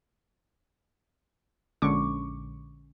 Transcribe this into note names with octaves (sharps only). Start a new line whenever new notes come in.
A#1 D3 G#3 C#4 C#6 D6